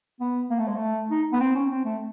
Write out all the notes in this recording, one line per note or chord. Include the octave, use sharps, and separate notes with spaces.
B3
A#3
A3
G#3
A3
D#4
B3
C4
C#4
C4
A3